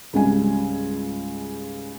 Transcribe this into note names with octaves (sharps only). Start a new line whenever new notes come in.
C#2 G#2 C#3 G3 G#5